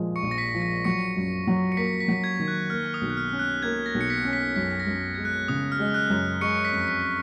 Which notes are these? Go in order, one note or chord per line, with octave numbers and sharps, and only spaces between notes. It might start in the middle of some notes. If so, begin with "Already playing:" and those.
Already playing: A#2 F3 G#3
C#6 C#7
A#1
A#6
B6
F3
A#6
F#3 C#6 C#7
F#2
F#3
C#7
A#3 B6
B6
F#3
G#6
D#3
F#6
A#3 F6
D#6
B1
F#6
F6
C#4
F#6
A#3 G#6
A#6
B1
C#7
B6
C#4
B6
F#2 B6
A#6
F#2
G#3 G#6
F#6
C#3 D#6
F6
G#3
F#6
F#2
G#3 C#6 C#7
B6
F2
B6